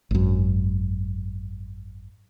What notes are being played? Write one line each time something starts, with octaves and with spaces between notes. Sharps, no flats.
G#1 F#2